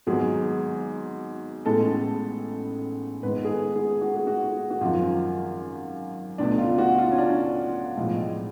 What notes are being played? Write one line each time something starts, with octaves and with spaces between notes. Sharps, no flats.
G#1 G#2 F#3 B3 G#4
A1 A2 G#3 B3 A4
G#1 G#2 G#3 B3 B4
G#4
A4
G#4
F#4
G#4
F#4
F#4
G#1 F#2 F3 F4
C#2 B2 A3 D4
F4
F#4
F4
C#4
D4
B1 A2 F3 G#3